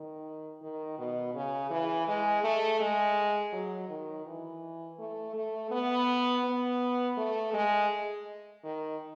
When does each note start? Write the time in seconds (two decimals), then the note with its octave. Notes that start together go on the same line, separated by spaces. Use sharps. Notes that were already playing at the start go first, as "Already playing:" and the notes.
Already playing: D#3
0.61 D#3
0.98 B2
1.35 C#3
1.70 E3
2.07 G#3
2.44 A3
2.80 G#3
3.53 F#3
3.89 D#3
4.26 E3
4.99 A3
5.35 A3
5.71 B3
6.44 B3
7.17 A3
7.53 G#3
8.64 D#3